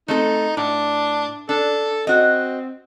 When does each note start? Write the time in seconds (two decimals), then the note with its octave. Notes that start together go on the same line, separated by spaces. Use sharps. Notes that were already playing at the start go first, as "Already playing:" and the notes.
0.08 A3 C4 D#4 A4
0.57 A2 D4
1.49 D4 A4
2.07 C4 F#4 D#5